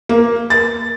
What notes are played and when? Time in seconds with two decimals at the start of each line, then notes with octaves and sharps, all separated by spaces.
0.09 A#3
0.50 A6